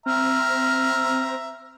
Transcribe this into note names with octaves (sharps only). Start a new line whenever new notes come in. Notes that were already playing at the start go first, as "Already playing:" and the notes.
C4 E5 A#5 F6